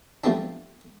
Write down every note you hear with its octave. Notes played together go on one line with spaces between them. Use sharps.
F3 G3 A3 B3 C4 D4